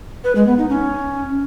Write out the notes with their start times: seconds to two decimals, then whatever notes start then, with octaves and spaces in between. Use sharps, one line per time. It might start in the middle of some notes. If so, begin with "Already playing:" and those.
0.24 B4
0.35 G#3
0.47 B3
0.58 D#4
0.69 C#4